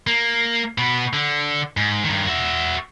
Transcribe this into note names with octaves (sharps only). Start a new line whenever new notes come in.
A#3
B2 B3
D3
G#2
G2 D#3
F#4 E5